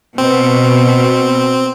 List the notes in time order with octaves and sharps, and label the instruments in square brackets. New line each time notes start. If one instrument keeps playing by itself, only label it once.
[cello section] B2 [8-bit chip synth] C4